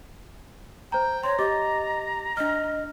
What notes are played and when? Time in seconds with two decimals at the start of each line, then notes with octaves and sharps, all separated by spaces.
0.92 C5 G5 A#5
1.24 C#5 A#5 C6
1.39 G4 D#5 D6 A6
2.37 D4 D#5 F6